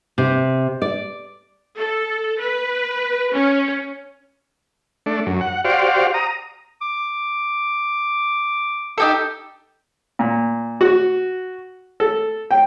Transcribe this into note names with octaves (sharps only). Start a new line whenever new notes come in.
C3
D5
A4
B4
C#4
A3 D4
F#2
F#5
F#4 G4 C5 D5 F5
A#5 D#6
D6
D#4 G4 A4
A#2
F#4
A4
G5